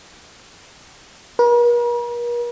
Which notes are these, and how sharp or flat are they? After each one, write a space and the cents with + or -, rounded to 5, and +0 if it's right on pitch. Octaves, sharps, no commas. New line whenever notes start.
A#4 +45